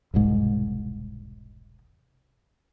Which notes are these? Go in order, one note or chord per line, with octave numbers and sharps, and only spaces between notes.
E1 C2 G#2